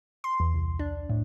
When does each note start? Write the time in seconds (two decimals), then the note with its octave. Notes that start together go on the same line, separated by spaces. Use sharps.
0.24 C6
0.40 E2
0.54 C2
0.79 D4
1.10 A2